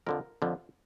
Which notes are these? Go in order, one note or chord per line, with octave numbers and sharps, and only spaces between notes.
F2 D3 F3 A#4
F2 D3 F3